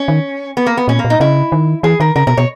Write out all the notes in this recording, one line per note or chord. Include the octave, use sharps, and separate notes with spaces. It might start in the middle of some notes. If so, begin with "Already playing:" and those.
Already playing: C#4
D#3
B3
A#3
B3
A#2 C#4
A#3
A#2
D#4
C#3 E4
D#3
E3 G#4
D#3 A#4
C#3 A#4
B2 A#4
B2 C#5